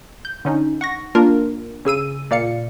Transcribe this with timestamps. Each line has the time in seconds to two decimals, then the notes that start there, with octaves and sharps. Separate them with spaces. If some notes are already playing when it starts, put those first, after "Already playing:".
0.25 G6
0.45 D3 C#4 D#4
0.81 F#5 C#6 A#6
1.15 A#3 D4 F4 A#4
1.85 C#3 G#4 E6 D#7
2.31 A#2 D5 F5 C#7